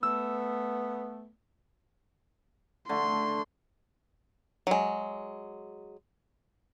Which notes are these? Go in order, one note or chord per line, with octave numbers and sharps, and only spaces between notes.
A3 B3 E6
D3 A3 C6
F#3 G#3